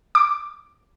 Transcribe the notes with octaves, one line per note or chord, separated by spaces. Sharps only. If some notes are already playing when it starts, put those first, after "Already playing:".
D6